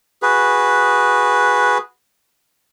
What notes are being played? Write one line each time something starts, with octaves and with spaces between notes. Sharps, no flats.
F#4 G#4 B4